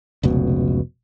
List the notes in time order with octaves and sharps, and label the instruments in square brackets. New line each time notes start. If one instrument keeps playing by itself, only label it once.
[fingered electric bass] F1 C#2 B2